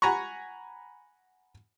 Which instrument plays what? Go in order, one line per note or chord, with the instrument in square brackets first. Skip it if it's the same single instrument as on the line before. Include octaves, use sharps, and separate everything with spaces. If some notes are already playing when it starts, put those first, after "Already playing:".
[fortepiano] F#5 G#5 A#5 B5 C#6